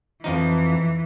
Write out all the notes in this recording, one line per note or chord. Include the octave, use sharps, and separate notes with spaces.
F2 E3 F3 D#4